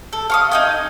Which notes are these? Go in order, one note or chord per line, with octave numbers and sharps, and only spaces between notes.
A4
F5 C#6 D#6
D#4 D#5 G#5